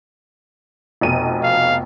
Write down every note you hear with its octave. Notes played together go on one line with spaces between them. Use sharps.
F1 B2 D#7
F5